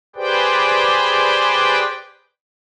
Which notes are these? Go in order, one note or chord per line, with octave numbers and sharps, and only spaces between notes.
G4 G#4 B4 C5 D5 G5